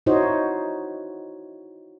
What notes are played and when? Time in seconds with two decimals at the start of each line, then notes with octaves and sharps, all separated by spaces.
0.06 D#4 E4 F#4 C5 C#5 D#5